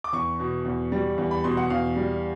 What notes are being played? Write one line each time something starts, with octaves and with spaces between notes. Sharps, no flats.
D6
E2 C#6
B2
E2
G3
E2
B5
B2 C6
F#5
E2 F5
G3